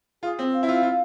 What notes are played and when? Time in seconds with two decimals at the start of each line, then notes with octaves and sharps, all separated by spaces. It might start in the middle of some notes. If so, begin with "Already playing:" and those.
0.23 F4 G#4
0.39 C4
0.54 F5
0.63 E4
0.68 F4
0.73 F5
0.83 F4